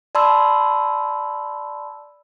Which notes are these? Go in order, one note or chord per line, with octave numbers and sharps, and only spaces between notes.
D5 A5 B5 C6 E6